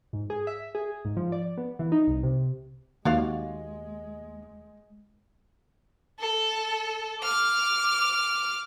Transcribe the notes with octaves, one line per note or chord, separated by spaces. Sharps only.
G#2
G#4
E5
G#4
G#2
F3
D5
B3
E3
D#4
C2
C3
D#2 G#3 F#4 D5 F5
A4
D6 F6